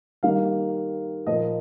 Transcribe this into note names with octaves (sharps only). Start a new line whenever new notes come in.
D#3 G3 A#3 F5
A#2 F3 A#3 D#5